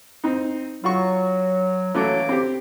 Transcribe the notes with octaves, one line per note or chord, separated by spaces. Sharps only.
C4 D#4
F#3 F4 F#4 C#6
E3 F#3 A3 A#3 C#4 D6
C4 G4